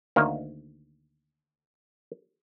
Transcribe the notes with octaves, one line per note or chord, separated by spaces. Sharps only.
D2 D#3 A#3